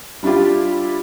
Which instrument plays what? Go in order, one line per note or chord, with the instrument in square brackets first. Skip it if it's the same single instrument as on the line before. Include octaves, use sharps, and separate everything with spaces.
[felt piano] G3 D4 E4 F4 G4